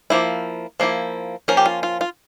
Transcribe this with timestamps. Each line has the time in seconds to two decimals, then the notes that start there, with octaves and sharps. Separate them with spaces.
0.10 F3 A#3 E4
0.80 F3 A#3 E4
1.48 F3 A#3 C#4 A#4
1.57 G4
1.66 F4
1.83 F4
2.01 F4